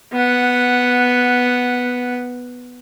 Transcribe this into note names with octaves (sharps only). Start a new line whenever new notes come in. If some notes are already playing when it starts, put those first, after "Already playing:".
B3 F#5